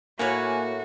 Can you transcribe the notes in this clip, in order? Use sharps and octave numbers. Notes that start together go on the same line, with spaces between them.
A2 A#3 F#4 B4 C#5 G#5